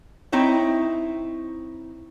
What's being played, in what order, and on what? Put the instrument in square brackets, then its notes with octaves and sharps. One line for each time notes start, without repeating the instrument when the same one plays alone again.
[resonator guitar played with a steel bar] C4 D#4 E4 C#5